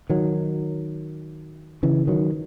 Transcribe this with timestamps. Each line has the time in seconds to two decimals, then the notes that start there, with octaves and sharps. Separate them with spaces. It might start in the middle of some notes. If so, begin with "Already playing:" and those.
0.10 D#3 F#3
1.83 C#3 E3
2.07 D#3 F#3